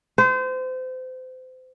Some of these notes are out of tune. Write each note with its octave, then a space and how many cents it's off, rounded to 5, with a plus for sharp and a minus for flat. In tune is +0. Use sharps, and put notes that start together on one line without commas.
C5 -30